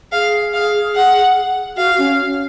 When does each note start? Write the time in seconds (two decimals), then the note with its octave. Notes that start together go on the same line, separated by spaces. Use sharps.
0.12 G#4 F5
0.53 F5
0.95 F#5
1.77 F#4 F5
1.98 C#4